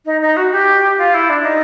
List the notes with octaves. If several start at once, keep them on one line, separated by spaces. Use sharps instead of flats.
D#4
D#4
F#4
G4
F4
E4
D4
D#4